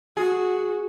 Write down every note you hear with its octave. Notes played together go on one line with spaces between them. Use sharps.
F#4 G#4